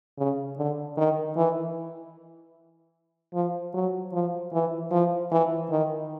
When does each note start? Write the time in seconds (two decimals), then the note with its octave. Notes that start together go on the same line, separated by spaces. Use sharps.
0.18 C#3
0.58 D3
0.97 D#3
1.37 E3
3.34 F3
3.74 F#3
4.13 F3
4.53 E3
4.91 F3
5.31 E3
5.71 D#3